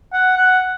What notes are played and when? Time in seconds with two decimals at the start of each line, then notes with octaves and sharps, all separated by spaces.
0.13 F#5
0.37 F#5